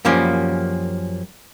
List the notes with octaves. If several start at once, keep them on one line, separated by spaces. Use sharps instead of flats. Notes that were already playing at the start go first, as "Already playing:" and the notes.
F#2 F3 G3 A#3 C#4